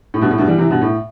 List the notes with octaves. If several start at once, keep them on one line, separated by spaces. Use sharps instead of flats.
A2
G2 B2
A2
G2 B2
E3 G3
C3 E3
G2 B2
A2